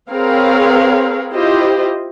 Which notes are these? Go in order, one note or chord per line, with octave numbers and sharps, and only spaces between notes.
C4 G#4 A#4 B4 C#5 F5
E4 F4 G4 C5 D#5